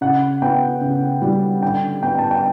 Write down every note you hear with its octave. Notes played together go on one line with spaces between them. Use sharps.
C#3 F#5
B3 G5
C#3
G3
D3 G5
B3 G5
A5
G5